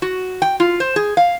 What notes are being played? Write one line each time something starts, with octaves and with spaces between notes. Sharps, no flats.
F#4
G5
F4
C5
G#4
F5